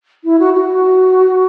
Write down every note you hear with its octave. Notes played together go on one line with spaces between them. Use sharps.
E4
F#4
F#4